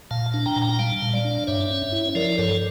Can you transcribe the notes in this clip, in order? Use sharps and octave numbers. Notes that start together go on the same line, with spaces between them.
A#2 F5 A5
D4
G5 A#5
A#2
G5 A#5
G3 F5 A5
A#2
D5 F5
D4
G2 C#5 E5
C#4
E4
F3 A#4 D5
G2 A4 C#5